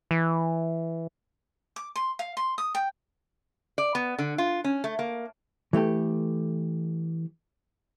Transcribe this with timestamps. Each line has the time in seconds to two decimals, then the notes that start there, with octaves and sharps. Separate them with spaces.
0.11 E3
1.76 D6
1.96 C6
2.19 F5
2.37 C6
2.58 D#6
2.75 G5
3.78 D5
3.95 B3
4.18 D3
4.38 F4
4.64 C#4
4.84 A3
4.99 A#3
5.73 E3 A3 G4 A4